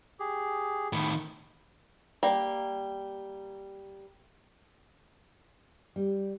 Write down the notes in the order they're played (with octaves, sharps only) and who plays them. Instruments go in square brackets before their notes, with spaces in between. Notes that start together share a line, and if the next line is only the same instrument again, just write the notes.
[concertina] G4 G#4
[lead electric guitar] A2 D#3 [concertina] B5
[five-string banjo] G3 A#3
[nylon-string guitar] G3